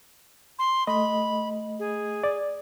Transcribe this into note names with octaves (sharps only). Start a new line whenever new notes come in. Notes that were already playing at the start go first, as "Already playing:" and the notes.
C6
A3 D#5 B5
G#4
D5